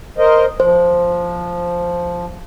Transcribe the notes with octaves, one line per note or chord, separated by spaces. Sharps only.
A#4 C5 D#5
F3 C5